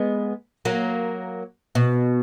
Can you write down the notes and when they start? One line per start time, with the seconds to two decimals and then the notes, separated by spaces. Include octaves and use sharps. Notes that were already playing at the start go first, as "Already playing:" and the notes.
Already playing: G#3 B3
0.65 F#3 A#3
1.75 B2